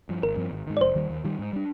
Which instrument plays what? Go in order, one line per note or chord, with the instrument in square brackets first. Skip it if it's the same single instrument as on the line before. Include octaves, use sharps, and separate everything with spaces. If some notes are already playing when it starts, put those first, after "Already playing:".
[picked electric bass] G2 F3
[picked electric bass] G#1 [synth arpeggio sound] A#4
[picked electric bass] G2 F3 C4
G#1
G#2 D#3
[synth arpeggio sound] D5
[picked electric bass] F1 [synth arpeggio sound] C5
[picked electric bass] D#2 D#3 G3
D#2
D#3 G3
G#2
G3 D4